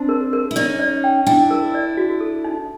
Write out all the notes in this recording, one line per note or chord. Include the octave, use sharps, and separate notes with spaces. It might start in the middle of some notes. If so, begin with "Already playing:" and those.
Already playing: C4 D4 A5
A#4
A#4
E4
C#4 D#4 D5
D5
G5
D4 E4 G5
A#4
D5
F#4
A4
D#4